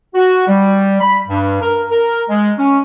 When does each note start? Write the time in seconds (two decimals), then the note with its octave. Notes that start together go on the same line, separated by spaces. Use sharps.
0.15 F#4
0.47 G3
1.00 B5
1.28 G2
1.62 A#4
1.91 A#4
2.28 G#3
2.58 C#4